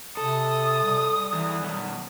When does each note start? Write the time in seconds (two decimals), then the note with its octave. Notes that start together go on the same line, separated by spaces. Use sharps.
0.17 C3 A4 D#6
0.84 G3
1.33 E2 E3
1.63 F#2 B2